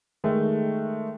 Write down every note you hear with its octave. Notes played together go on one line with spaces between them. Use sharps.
D#3 G#3 A3